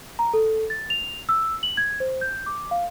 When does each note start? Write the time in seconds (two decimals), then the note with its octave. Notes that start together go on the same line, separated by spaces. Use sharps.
0.19 A#5
0.34 A4
0.70 A6
0.90 F7
1.29 E6
1.63 F#7
1.77 G#6
2.00 C5
2.21 G6
2.46 D6
2.71 F5